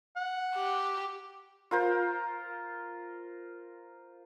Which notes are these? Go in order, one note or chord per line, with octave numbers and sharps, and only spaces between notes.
F#5
G4
F4 A#4 C5